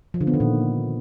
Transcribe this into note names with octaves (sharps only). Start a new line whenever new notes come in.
F3
D3
B3
D#3
A#2